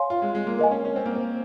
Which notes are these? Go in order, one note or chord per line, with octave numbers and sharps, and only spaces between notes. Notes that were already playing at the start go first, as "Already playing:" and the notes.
Already playing: C#5 F5 G#5 C6
F4
G#3
G#3
A#3
A#4 D#5 G#5
C#4
C#4
C4
A#3
C4